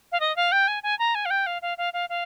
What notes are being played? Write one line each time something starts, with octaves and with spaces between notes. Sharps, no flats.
F5
D#5
F5
G5
G#5
G#5
A#5
G#5
F5
G5
F5
F5
F5
F5
F5